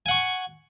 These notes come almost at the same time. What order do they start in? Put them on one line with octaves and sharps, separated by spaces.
G#5 F#5 C#6